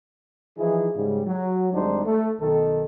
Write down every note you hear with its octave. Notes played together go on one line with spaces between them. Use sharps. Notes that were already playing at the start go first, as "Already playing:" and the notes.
E3 F3 D#4 E4 G#4
G#2 C#3 G3
F#3
G#1 G#2 G3 D4 D#4 C5
A3
B1 D#3 A4